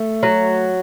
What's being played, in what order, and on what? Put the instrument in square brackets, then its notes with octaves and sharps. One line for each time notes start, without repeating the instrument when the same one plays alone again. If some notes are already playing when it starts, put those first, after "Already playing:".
Already playing: [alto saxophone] A3
[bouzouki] F#3